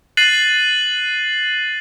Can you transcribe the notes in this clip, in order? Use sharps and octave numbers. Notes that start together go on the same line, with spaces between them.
F#6 A6 C7 D#7 F#7